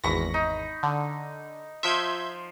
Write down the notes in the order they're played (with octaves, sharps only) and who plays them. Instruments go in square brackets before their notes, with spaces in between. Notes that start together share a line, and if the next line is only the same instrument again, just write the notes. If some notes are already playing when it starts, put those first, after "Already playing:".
[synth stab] G#1 E2 A#6 [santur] B5 C#6
[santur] D#4
[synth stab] D3
[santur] F3 C6 [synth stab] E5 G6 G#6